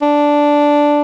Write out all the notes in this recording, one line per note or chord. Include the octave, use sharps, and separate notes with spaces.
D4